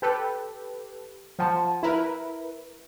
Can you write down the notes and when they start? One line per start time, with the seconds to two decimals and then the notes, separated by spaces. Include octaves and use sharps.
0.02 G4 A4 B4
1.39 F3 F#5 G#5 A5
1.83 E4 A#4 B4